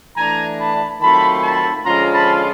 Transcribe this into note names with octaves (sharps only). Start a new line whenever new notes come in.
E3 A3 D4 G#5 A#5
A5 B5
D#3 F#3 A3 C4 F4 A5 B5
A5 B5
D3 F3 G#3 C#4 F4 A#5 C6
A5 B5